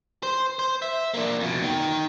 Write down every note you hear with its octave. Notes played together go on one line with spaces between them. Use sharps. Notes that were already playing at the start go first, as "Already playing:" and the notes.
C5
C5
E5
A#3 D4
F2 B2
D#4 G5